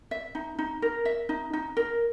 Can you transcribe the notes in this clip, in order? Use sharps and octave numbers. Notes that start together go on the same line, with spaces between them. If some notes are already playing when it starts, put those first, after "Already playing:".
E5
D#4
D#4
A#4
E5
D#4
D#4
A#4